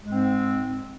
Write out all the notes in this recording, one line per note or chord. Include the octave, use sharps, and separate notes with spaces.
G#2 G#3 C4